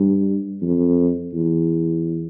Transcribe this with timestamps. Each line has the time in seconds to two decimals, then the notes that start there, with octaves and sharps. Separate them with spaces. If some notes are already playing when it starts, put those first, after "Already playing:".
Already playing: G2
0.62 F2
1.33 E2